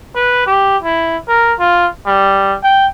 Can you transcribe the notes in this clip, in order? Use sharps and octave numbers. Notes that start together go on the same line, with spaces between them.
B4
G4
E4
A#4
F4
G3
G5